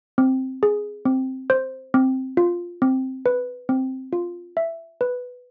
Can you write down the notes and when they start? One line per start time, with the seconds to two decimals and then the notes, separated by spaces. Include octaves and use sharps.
0.18 C4
0.63 G#4
1.05 C4
1.50 C5
1.94 C4
2.37 F4
2.82 C4
3.26 B4
3.69 C4
4.13 F4
4.57 E5
5.01 B4